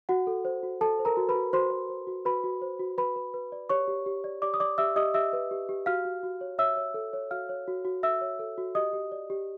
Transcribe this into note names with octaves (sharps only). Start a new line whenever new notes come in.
F#4 F#5
A4
C5
F#4
A4 A5
C5
A#4 A#5
F#4
B4 B5
F#4
F#4 C5 C6
C5
C5
F#4
F#4 B4 B5
F#4
C5
F#4
B4 B5
B4
B4
D5
G4 C#5 C#6
G4
G4
D5
G4 D5 D6
D#6
D5 D6
G4 E5 E6
G4 D#5 D#6
G4 E5 E6
B4
G4
G4
F#4 F5 F6
F#4
F#4
C#5
C#5 E5 E6
C#5
A4
C#5
F#4 F5 F6
C#5
F#4
F#4
A4 E5 E6
C#5
A4
F#4
G4 D#5 D#6
G4
D5
G4